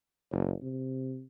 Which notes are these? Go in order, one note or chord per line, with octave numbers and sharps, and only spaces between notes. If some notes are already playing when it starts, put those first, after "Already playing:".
F#1
C3